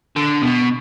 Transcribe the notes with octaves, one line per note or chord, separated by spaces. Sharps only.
D3
B2